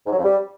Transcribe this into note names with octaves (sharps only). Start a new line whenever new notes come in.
G#2
F#3
F2
G3